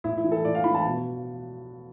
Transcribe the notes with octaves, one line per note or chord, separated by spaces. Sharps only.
A2 E4
E4
E3
A4
A2 D5
F5
E3 B5
A5
B2